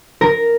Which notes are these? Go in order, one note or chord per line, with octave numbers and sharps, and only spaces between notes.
A#4